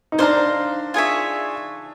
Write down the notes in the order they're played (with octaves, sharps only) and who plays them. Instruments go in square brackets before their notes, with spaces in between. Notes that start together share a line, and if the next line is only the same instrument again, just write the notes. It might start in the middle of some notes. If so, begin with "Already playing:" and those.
[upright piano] D#4
[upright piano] D4 [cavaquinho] C5 F5 A#5
[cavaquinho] F4 G#4 C#5 E5